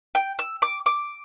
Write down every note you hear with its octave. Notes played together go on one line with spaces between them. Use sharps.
G5
E6
D6
D6